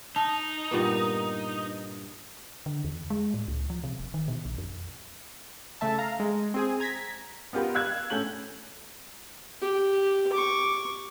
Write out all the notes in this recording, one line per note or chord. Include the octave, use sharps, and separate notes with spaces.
D#4 A5
G2 A#2 B3
D3
E2
G#3
A2
C#2
F3
C3
D#1
D#3
B2
A#1
F2
C#3 A3 E5 A5
F5 A#5
G#3
C4 G#4 G#5
A#5 G#6 A#6 B6
B3 F4 G4 A#4 B4
F5 E6 F#6 G#6
A2 C#4 A4 G6 F#7
G4
C#6 D6